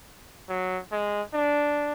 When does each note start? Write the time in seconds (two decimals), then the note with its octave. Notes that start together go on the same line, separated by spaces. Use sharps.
0.49 F#3
0.92 G#3
1.34 D4